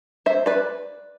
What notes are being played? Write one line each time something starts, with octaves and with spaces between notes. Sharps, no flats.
C5 E5
B4 D5